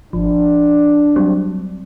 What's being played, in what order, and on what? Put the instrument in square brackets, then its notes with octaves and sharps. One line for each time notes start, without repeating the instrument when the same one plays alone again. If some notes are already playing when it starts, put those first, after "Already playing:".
[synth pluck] G#1 F3 [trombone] D4
[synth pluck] F#3 G3 C4